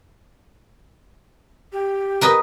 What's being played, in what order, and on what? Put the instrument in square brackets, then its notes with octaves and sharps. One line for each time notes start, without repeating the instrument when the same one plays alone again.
[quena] G4
[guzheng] A#4 B4 D#5